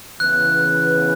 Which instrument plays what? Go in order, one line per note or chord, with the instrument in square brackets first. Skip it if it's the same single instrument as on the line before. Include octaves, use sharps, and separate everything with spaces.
[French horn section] C#3 E3 B3 [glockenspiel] F#6